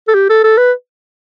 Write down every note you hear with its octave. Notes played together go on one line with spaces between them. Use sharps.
A4
G4
A4
A4
B4